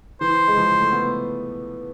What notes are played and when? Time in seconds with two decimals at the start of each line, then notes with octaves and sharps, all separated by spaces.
0.21 E3 C5
0.48 G#3
0.57 F3
0.81 A3
0.92 B3